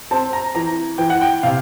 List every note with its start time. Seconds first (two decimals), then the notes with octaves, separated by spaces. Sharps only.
0.11 C4 A5
0.33 A#5
0.55 E3 A#5
0.98 E3 G5
1.10 F#5
1.21 G5
1.43 C3 F5